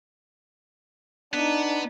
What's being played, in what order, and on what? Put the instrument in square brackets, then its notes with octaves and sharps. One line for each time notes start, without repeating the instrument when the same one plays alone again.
[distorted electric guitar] B3 [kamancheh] D4 D#4